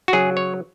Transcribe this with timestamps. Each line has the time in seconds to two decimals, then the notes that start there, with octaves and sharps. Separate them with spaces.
0.08 F#4
0.13 C#3 F#3 G#4
0.37 C#5